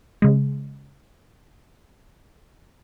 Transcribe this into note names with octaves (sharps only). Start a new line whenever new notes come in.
C#3 G#3